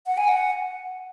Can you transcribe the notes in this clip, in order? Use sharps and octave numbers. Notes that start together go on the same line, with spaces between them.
F#5
G#5
F#5